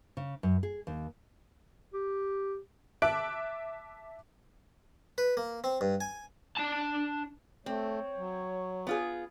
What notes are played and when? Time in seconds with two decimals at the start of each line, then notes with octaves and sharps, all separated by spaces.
0.17 C#3
0.43 F#2
0.63 G#4
0.87 D#2
1.93 G4
3.02 E5 A5 D6 F#6 D7
5.18 B4
5.37 A#3
5.64 C4
5.81 G2
6.01 G#5
6.58 D4 A5
7.66 A3 C4 C#5
8.17 F#3
8.87 B3 F4 G#4